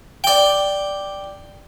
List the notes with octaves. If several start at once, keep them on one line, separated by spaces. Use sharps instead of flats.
D5 G5